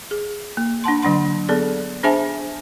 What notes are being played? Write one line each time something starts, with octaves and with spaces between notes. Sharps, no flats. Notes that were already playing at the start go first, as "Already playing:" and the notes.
G#4
A#3
D4 F#5 A5 C6
D3 F#3 D4 F#5 C6
B3 G#4 A4 D5
D4 G#4 C5 E5 G#5 A5